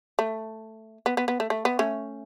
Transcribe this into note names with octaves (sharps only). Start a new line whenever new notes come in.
A3
B3
B3
B3
A3
A3
B3
A3 C#4